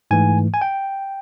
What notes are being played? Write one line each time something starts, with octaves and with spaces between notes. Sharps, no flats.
G#2 E3 A3 G#5
G#5
G5